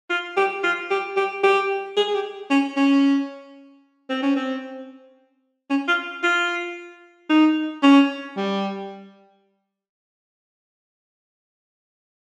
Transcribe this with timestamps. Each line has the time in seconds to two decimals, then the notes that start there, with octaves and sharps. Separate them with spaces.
0.10 F4
0.36 G4
0.63 F4
0.90 G4
1.16 G4
1.43 G4
1.97 G#4
2.08 G#4
2.14 G4
2.50 C#4
2.77 C#4
4.10 C4
4.22 C#4
4.36 C4
5.70 C#4
5.88 F4
6.23 F4
7.29 D#4
7.83 C#4
8.36 G3